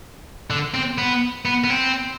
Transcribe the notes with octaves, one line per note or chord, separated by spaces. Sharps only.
D3
C4
B3
B3
B3
C4